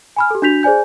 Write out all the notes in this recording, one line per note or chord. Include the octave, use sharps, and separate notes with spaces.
G#5 B5 F6
G4 A4
D4 F#4 G6 B6 F7
G#4 C5 D5 G#5 G6